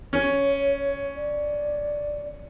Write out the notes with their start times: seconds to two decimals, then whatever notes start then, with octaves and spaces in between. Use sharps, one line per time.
0.13 C#4 C#5
1.16 D5